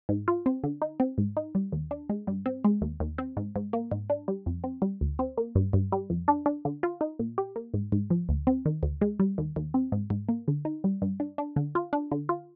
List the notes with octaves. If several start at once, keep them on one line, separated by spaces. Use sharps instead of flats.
G#2
F4
C4
D3
D#4
C4
G#2
D#4
G3
D#2
D4
G#3
G2
C4
G#3
D#2
D#2
C4
G#2
G#2
A#3
G#2
D4
G3
F2
C4
G3
D2
C4
A#3
G2
G2
G3
F2
D4
D4
D3
F4
D#4
A#2
G4
A#3
G#2
G#2
F3
D2
C4
D#3
D2
G#3
G3
D#2
D#2
C4
G#2
G#2
A#3
D3
D#4
G3
G2
D4
D4
D3
F4
D4
D3
F4